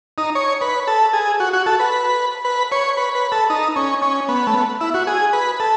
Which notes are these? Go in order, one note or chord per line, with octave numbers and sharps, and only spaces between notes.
D#4
C#5
B4
A4
G#4
F#4
F#4
A4
B4
B4
C#5
B4
B4
A4
D#4
C#4
C#4
B3
A3
B3
E4
F#4
G#4
B4
A4